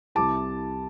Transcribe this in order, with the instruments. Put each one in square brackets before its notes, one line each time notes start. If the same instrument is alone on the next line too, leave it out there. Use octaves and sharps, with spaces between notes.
[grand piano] C2 C3 G3 E4 A5 D6